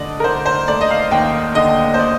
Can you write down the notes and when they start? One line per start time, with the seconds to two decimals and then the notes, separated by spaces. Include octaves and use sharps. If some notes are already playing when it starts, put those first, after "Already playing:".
Already playing: D3 A3 D5 D#5
0.20 A#4
0.24 D3 C5
0.46 C5
0.68 A3 D5
0.81 D#5
0.90 F5
1.11 D#2 G5
1.55 D3 D#5
1.94 C5
1.99 D5